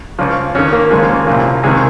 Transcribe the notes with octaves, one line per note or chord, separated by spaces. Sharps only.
C#2 C#3 F3
F2 D#3 C#4
A#3
D#2 C#3 F3 G#3
A#3
C2 A#2 F3
C#2 C3 D#3 G#3